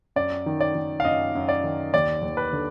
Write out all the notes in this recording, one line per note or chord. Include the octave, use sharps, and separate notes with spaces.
F#2 D5
D#3
D5
D#3
F5
F#2 D#5
F#2
D5
D#3
D#2 D5
D#2
B4
D3